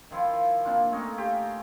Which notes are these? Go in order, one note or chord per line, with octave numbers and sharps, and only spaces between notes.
D#3 F3 E4 F4
A#3 C4 D4 F4
A3 C#4 D#4 A#4
F4 G4 G5